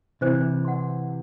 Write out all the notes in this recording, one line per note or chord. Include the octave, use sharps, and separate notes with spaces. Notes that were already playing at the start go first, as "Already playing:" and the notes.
C3 E3 C5
F#5 C6